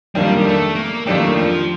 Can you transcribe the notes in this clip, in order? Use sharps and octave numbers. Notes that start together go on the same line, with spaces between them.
F2 D#3 G3 A#3 D4 G4
G3
A3
A#3
F2 D#3 A3 A#3 D4 G4
F3